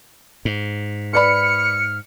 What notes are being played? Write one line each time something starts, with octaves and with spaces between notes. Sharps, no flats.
G#2
B4 D5 B5 F6 C#7